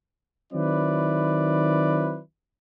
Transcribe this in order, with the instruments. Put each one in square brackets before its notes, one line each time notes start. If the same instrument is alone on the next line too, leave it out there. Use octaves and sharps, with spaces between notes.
[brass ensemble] D#3 F#3 C4 E4 B4 D5